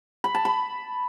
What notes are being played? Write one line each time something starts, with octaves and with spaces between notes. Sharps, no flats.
B5
A5
B5